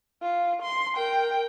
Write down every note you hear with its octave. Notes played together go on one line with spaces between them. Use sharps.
F4
C6
A#4 G5